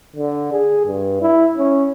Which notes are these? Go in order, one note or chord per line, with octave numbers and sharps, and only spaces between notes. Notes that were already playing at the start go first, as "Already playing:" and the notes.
D3
G#4
G2
E4
C#4